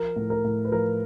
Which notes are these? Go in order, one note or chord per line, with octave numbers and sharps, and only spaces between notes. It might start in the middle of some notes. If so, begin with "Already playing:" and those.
Already playing: F3 A#4
A2
A#4
A2
B4
F3 A#4